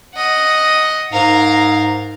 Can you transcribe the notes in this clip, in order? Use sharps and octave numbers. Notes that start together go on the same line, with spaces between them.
D#5 F#5
G#2 A#4 F5